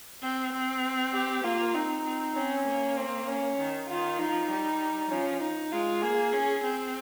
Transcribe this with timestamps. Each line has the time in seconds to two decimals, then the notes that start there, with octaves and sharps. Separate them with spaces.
0.22 C4
0.52 C4
1.14 G4
1.44 A#3 F4
1.74 C4 D#4
2.05 C4
2.35 C4 C#4
2.66 A#3
2.97 C4
3.27 C#4
3.58 D#3
3.88 D#3 F4
4.18 F3 D#4
4.50 G3
5.10 F3 C#4
5.41 D#4
5.72 G#3 F4
6.02 A#3 G#4
6.33 C#4
6.64 C4